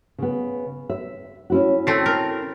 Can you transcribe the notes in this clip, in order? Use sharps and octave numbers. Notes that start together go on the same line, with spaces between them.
C#3 B3
E5
C#4 E4 F#4
A3 C4
A#4